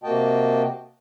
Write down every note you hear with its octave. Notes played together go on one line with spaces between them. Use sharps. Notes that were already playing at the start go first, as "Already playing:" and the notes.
C3 A#3 F#4 D#5 G5 A5